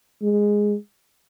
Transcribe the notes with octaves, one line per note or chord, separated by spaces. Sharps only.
G#3